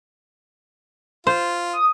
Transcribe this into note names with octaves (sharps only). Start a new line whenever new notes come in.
F4 C5
D#6